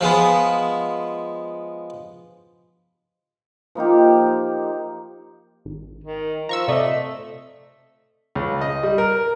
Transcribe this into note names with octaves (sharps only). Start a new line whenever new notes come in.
F3 G#3 B3
F3 A#3 D#4 G4
G#1
D#3
F3 A#5 C#6 E6
C3 A3 D5 D#5
C#2
D#5
G3
A#4